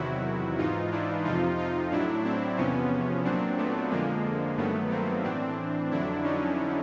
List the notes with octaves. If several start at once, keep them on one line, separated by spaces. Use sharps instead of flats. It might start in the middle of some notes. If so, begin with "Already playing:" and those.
Already playing: E2 C3 D#3 F#3 E4 F#4
G#2 E3 D#4 F4
D4 E4
F2 C3 F3 D#4 F4
D#4 F4
A2 F#3 D4 E4
C4 D4
E2 C3 F3 B3 C#4
A#2 F#3 C4 D4
A3 B3
F2 D3 F3 G#3 A#3
G2 D#3 F#3 A3 B3
A#3 C4
A2 E3 C4 D4
F2 D3 F#3 D4 E4
C#4 D#4